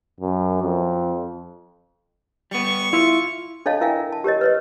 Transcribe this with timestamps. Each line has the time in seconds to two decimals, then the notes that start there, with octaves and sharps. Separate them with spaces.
0.20 F#2
0.63 F2
2.51 G3 B3 C#6
2.93 E4 F4 E5
3.66 D4 A4 C#5 D#5 F5 A5
3.81 E4 A#4 E5 F5 G5 G#5
4.12 A5
4.24 G4 A#4 C#5 D#5
4.41 B4 C#5 D#5